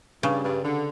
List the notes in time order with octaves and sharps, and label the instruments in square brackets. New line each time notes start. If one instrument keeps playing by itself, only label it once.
[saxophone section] G2 [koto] C#3
[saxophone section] G2
D3